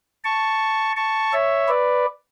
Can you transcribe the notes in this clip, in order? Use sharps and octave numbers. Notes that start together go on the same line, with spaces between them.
A5 C#6
A5 C#6
C#5 E5
B4 D5